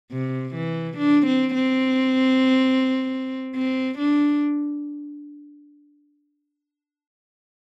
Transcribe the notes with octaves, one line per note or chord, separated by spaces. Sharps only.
C3
E3
D4
C4
C4
C4
D4